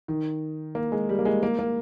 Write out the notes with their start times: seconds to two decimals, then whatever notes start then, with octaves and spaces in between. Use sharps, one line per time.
0.08 D#3
0.75 A#3
0.92 G#3
1.09 G3
1.19 A#3
1.25 G#3
1.43 A#3
1.59 A#3